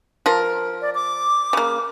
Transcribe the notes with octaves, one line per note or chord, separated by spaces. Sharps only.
F3 A#4
D5
D6
C#3 A#3